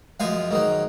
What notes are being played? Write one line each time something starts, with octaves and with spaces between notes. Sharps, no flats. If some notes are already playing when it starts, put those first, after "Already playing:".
F#2 F3 G#3 F5 G#5
G#2 D#3 F#3